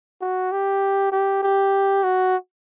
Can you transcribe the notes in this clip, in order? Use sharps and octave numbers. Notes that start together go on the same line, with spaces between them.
F#4
G4
G4
G4
F#4